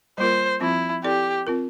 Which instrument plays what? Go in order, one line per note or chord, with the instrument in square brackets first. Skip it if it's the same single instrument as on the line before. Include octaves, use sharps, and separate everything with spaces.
[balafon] G3 A#3 F4 A#4 [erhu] C5
[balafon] F3 C4 F4 [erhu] E4
[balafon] C4 E4 A4 D5 [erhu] G4
[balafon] C4 F4 A#4